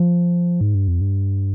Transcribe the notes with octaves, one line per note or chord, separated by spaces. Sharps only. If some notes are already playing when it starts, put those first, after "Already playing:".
Already playing: F3
G#2
G2
F2
G2